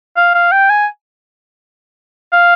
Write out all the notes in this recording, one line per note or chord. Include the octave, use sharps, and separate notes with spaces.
F5
F5
G5
G#5
F5